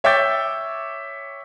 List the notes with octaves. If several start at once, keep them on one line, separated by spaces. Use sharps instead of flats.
C#5 E5 G5 D6 G6 A6